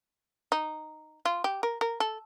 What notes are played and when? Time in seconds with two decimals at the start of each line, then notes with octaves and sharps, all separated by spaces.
0.52 D#4
1.25 F4
1.44 G4
1.63 A#4
1.81 A#4
2.00 A4